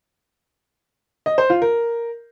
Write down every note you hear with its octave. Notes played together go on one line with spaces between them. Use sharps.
D#5
C5
F4
A#4